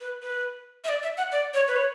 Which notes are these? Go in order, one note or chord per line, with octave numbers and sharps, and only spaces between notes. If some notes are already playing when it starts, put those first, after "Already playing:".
B4
B4
E5
D5
E5
F#5
D5
C#5
B4
C#5